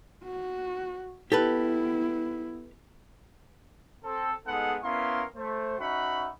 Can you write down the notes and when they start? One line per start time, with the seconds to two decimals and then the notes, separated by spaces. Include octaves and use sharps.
0.24 F#4
1.32 B3 E4 G4 A4 B4
4.04 C4 A4
4.46 G#3 B3 D#4 G#4 A4 F#5
4.82 B3 C#4 E4 A#4 F5 C6
5.36 A3 C5
5.78 C#4 D#4 F#4 E5 F#5 B5